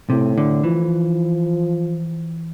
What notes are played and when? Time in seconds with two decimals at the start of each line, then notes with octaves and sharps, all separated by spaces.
0.10 A2 C3
0.38 D3
0.64 E3 F3